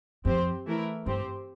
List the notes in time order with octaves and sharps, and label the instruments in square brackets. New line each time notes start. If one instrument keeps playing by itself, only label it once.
[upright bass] F2 [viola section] C4 G4 C5
[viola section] E3 A3 E4 A#4
[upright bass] G2 [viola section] C4 G4 C5